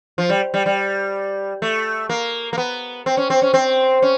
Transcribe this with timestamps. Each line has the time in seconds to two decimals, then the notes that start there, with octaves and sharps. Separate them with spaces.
0.18 F3
0.29 G3
0.54 G3
0.66 G3
1.62 A3
2.09 A#3
2.53 A#3
2.58 B3
3.06 C4
3.17 C#4
3.30 C4
3.42 C#4
3.54 C4
4.02 C#4